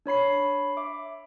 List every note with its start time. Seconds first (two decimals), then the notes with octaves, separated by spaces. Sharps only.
0.06 D4 C#5 B5 C7
0.77 E5 D6